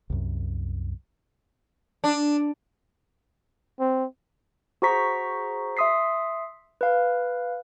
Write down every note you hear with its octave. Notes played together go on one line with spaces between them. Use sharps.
C2 F#2
D4
C4
F#4 G#4 C5 A#5 C#6 B6
E5 C6 D#6 B6 C7
B4 F5